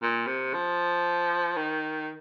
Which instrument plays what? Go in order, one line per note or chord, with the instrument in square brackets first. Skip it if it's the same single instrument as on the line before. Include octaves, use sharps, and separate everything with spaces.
[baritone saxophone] A#2
C3
F3
D#3